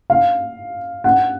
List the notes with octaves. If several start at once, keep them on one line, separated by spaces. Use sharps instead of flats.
F5
F#5